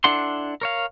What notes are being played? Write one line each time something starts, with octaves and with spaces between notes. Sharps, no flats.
D4 E4 A4 F#5 C6
A#4 C#5 F5